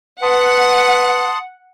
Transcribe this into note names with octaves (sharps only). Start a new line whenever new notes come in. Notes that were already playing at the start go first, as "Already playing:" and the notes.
B4 F#5 A5 C6 D#6